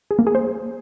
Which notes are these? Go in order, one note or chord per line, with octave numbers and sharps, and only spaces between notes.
G#4
A#3
G#4
C5